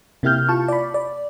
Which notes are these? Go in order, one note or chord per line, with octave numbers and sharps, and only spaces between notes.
C3 A#3 E4 G4 F6 G6
F4 A5 C#6
D5 B5
D5